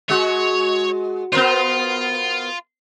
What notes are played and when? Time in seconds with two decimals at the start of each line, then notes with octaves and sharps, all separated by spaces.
0.09 G#3 F#4 C#5
1.32 B3 F4 A#4 C5